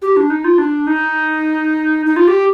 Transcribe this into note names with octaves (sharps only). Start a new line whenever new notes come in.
G4
D4
D#4
F4
D4
D#4
D#4
F4
G4